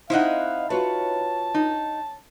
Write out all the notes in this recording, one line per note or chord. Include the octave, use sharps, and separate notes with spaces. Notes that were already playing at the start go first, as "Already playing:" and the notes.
C4 D#4 E4 D#5 F5 F#5
F4 F#4 B4 C#5 A5
D#4